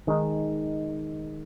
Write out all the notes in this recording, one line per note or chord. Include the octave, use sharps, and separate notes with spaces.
D#3 G#3 D#4